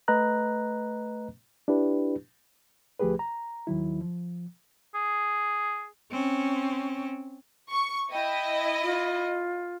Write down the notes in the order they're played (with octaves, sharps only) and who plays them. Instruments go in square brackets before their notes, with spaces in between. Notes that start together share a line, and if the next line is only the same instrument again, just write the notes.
[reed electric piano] A3 B4 D#5 A#5 F#6
D4 E4 G4 B4
D2 F3 A3 G4 G#4 B4
A#5
D#2 D#3 F#3 E4
F3
[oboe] G#4
[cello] C4 C#4
[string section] C#6
[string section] E4 D#5 [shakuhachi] G5
[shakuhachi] F4